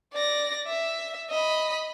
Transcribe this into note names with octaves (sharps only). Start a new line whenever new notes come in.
D5 A#6
E5
D#5 B5